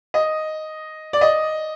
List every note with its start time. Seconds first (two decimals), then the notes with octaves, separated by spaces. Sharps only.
0.14 D#5
1.13 D5
1.21 D#5